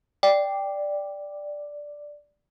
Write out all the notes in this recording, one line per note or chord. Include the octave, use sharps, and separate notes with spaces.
D5 G5